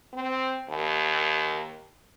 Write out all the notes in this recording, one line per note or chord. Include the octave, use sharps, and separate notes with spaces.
C4
D#2